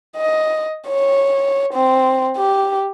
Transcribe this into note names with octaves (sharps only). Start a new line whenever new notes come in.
D#5
C#5
C4
G4